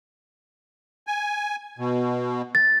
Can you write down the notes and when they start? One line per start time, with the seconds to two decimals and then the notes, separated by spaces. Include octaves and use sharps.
1.07 G#5
1.78 B2
2.55 A6